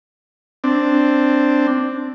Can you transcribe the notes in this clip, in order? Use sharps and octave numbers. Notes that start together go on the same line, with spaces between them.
C4 D4